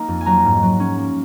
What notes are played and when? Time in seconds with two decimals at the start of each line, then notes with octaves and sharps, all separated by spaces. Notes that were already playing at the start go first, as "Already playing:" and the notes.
Already playing: A#3 D#4
0.08 F2
0.21 G#5
0.26 F#3 A#5
0.45 G#2
0.62 F#3
0.80 C#4
0.98 A#3